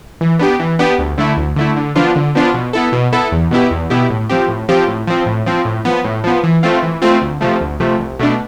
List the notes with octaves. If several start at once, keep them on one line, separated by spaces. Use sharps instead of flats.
E3
B3 D4 G4
E3
B3 D4 G4
D2
D3 A3 E4
D2
D3 A3 E4
D3
F3 B3 D4 F4
D3
F3 B3 D4 F4
B2
B3 E4 A4
B2
B3 E4 A4
E2
B2 B3 E4 G4
E2
B2 B3 E4 G4
A2
F3 C4 G4
A2
F3 C4 G4
A2
F3 C4
A2
F3 C4
A2
F3 B3
A2
F3 B3
E3
A3 C4 F4
E3
A3 C4 F4
D2
C3 F3 A3
D2
C3 F3 A3
C2
B2 A3 D4